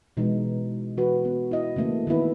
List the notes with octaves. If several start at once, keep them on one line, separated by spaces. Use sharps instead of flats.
B2 E3 G#3 D#4
E3 F#4 B4
B3
E4 D#5
C#3 E3 A3 A#3
D#3 E3 B3 E4 B4